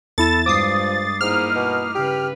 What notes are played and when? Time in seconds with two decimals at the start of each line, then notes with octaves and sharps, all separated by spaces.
0.18 E2 E4 A4 A6 E7
0.46 G2 F3 G#3 D6 D#6 C7
1.21 G#2 A#3 D#4 E4 F6
1.56 B2
1.95 C#3 G4 B4